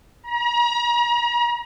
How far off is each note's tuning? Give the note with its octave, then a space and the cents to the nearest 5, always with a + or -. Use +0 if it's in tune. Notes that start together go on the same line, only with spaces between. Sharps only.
A#5 +40